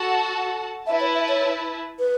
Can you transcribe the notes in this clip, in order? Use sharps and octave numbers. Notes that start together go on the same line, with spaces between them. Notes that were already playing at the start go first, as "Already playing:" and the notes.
Already playing: F#4 A4 F#5 A5
E4 B4 E5 A5
C#5
E5
C#5
B4